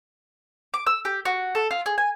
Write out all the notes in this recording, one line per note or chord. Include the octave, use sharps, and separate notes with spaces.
D6
E6
G4
F#4
A4
F4
G#4
G#5